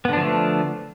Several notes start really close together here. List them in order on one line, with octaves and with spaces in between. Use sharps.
B3 D3 D4 F3 A3